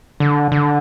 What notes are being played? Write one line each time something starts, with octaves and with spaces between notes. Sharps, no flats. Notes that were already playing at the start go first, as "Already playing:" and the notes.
D3
D3